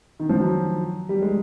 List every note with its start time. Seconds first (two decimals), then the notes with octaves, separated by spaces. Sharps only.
0.20 D#3
0.29 F3
0.39 F#3
1.09 G3
1.22 G#3